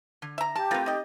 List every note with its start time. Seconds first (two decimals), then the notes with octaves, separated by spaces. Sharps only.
0.22 D3
0.38 E5 A#5
0.56 G4 A5
0.71 A3 C4 F4 A#4 B4
0.86 D#4 D#5